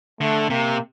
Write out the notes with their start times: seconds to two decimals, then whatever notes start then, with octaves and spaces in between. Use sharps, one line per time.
0.21 D3 A3
0.50 C3 A#3